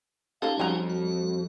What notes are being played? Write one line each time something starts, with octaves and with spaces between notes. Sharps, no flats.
A#3 C#4 D#4 F4 G4 A4 F5
F2 F#3 G3 G#5 A#5
F#4